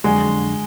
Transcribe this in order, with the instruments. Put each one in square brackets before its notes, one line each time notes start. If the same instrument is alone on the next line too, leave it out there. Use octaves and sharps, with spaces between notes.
[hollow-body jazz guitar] F2 D3 F#3 D4 F#4 [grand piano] G#3